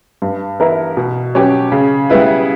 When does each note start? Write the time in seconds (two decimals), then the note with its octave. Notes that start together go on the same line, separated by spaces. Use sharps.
0.22 G2
0.60 E3 B3 E4 A#4
0.97 B2
1.35 F#3 C#4 G4 B4
1.72 C#3
2.10 G3 B3 E4 B4